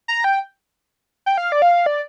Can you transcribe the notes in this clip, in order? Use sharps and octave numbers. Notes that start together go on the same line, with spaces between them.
A#5
G5
G5
F5
D5
F5
D5